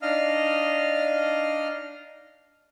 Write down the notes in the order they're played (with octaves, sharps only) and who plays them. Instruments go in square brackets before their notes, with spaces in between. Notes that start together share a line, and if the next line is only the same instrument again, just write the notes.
[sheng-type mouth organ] D4 D#4 D#5 F5 F6